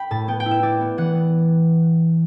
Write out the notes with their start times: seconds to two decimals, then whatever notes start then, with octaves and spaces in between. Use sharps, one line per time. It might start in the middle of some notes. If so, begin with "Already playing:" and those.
Already playing: G5 B5
0.11 A2 A5
0.28 B3 G5
0.40 G5
0.46 E4
0.51 E5
0.63 E4 D5
0.81 B3
0.98 E3 F#5
1.15 B3